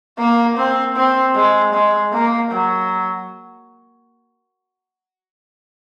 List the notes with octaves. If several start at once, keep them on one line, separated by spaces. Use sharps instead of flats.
A#3
C4
C4
G#3
G#3
A#3
F#3